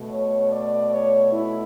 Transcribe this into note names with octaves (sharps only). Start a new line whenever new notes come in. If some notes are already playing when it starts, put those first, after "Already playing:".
Already playing: B2 A3
C#5
D5
C#5
E4